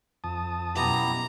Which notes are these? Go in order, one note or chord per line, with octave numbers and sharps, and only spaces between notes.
F2 A5 D#6
F#2 B2 B3 E4 G4 A#5